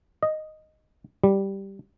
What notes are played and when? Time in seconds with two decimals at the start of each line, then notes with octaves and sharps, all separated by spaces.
0.23 D#5
1.24 G3